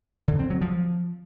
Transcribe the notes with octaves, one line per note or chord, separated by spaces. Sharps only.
D3
C4
F#3
F3